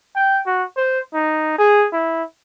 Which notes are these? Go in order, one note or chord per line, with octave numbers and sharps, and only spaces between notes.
G5
F#4
C5
D#4
G#4
E4